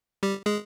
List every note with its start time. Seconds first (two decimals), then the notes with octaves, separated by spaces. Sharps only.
0.23 G3 G4
0.46 G#3 G#4